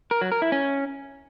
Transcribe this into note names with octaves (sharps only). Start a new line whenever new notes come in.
A#4
F#3
A#4
E4
C#4